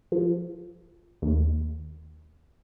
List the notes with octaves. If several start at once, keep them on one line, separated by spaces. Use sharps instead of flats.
F3
D#2